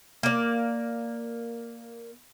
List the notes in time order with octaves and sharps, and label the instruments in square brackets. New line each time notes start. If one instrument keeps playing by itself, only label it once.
[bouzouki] A#3 D5